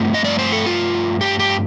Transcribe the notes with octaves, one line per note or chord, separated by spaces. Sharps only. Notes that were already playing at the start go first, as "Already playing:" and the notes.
Already playing: G2 F3 A3 C4
D#5
D5
C5
A4
F4
G4
G4